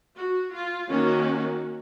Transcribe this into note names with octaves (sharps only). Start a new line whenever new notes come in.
F#4
F4
D#3 A#3 C#4 F#4